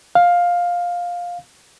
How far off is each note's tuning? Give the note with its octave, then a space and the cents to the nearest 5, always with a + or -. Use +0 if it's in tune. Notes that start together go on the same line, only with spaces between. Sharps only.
F5 +10